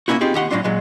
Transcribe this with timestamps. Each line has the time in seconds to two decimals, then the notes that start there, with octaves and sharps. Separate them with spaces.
0.08 A#3 C4 C#4 E4 F#4
0.21 C4 D#4 F4 G4 G#4
0.34 D#2 G4 F#5 C6
0.51 A2 D3 F#3 C#4 D4 F4
0.64 A#2 F#3 G#3